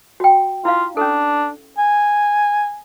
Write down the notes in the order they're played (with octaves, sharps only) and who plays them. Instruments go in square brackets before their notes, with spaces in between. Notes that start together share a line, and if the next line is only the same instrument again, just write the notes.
[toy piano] F#4 G5
[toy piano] E4 F5 [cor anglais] F4
[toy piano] C#4 A4 [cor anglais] D4
[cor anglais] G#5